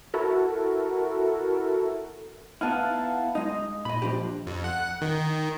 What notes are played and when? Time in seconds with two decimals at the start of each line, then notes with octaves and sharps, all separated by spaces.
0.14 E4 F#4 A4 A#4
2.61 B3 D#4 E4 F5 F#5 A5
3.35 G#3 D#4 D#5
3.85 A#2 D#5 B5
4.02 F3 D4 G4
4.47 F2
4.64 F#5
5.01 D#3